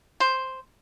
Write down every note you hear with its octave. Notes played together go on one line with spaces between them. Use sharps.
C5